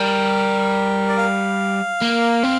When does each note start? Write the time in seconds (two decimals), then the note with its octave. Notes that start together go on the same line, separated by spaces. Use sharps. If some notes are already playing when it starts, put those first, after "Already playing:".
Already playing: G3 A#4
1.09 D5
1.17 F5
2.02 A#3
2.44 C4